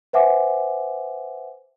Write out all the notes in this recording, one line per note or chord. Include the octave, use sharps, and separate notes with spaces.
B4 C5 E5 F#5 G#5 D6